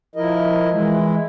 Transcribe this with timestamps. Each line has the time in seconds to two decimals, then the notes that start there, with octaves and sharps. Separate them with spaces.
0.16 F3 E4 A#4 D#5
0.71 E3 G#3 E4